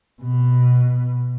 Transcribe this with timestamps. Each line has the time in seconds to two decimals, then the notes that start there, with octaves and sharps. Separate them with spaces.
0.22 B2